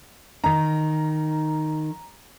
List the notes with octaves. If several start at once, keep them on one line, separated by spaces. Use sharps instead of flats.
D#3 D#4 A#5